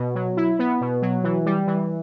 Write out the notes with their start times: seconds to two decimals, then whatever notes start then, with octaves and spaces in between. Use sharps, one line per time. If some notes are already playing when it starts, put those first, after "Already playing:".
Already playing: B2
0.15 F#3
0.37 E4
0.59 B3
0.81 B2
1.02 F#3
1.24 E3
1.46 G3
1.67 E3